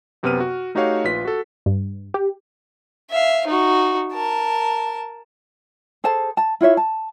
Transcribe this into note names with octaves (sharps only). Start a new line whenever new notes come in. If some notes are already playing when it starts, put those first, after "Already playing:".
F#2 C3 B3 B4 F6 D#7
F#4
A3 D#4 F#4 G4 C#5 F5
A#1 F4 B4 B6
F#4 A4
G2
G4
E5 F5
D#4 F#4
A#4 A5
G#4 A4 C5 A5
A5
E4 F4 C#5 E5
A5